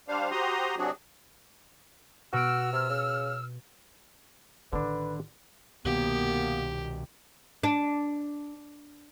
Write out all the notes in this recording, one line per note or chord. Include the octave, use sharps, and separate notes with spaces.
G3 D4 C5 F5
F#4 G4 C5 A#5 C6 D#6
C3 F#3 C4 D4 F#4 G#4
B2 F#4 E6 F6 D7
C3
C#3
A1 D3 D#3 D4 B4
C2 B2 D#3 A#3 B3 G4
D4